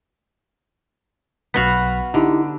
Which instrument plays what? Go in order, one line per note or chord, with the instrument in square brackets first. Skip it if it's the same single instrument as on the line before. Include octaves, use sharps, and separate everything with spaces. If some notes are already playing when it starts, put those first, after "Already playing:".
[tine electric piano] B1 B5 B6 [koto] B3 F#4 F5
[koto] D3 [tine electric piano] D#4 E4 G4